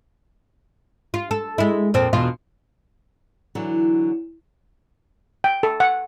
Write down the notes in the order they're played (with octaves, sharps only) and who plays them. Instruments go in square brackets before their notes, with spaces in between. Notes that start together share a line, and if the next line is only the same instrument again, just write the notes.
[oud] F4
A4
G#3 E4
F2 A#2 C4
E2 B2 F4
[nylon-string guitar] D3 E3 F#3
[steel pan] G5
A4
F#5